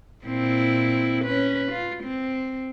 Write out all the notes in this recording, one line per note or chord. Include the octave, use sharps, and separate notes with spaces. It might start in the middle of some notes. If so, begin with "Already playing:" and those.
A#2 C4 E4
C#4 B4
F4
C4